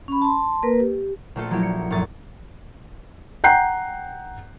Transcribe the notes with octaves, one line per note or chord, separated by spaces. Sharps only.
C#4 B5
A5 C6
A#3 A#4 B4
G4
A#1 A3 F4 A4
F3 F#3 A#3 D4 E4 G4
C#7
F1 A#1 F#2 C#6 D#6 A6
F#5 G5 A#5 F#6 G6 C7